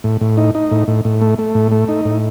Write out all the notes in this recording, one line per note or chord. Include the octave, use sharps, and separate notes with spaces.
A2
A2
D#4
D#4
A2
A2
A2
A3
A3
A2
A3
D#4
A2